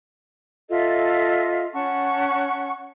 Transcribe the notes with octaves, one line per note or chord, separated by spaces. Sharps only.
F4 A4 D#5 E5
C#4 F#5 A5 C#6